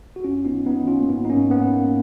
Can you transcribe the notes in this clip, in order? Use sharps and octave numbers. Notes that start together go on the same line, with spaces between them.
F#4
F#2 C#4 F4
B3 D#4
D#3
B3 D#4
D#3
C#4 F4
A#3
G#2 B3
D#4
A#3 C#4
G#2
B3
G#2
A#3